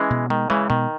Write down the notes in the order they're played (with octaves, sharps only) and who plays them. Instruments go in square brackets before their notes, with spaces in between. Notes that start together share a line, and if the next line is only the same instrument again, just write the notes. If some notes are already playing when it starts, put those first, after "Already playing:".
Already playing: [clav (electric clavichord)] E3 G#3 [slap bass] C#4
[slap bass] B2
[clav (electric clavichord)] D#3 [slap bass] G#3
[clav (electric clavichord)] C#3 E3 [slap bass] G#3
[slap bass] B2 [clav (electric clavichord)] D#3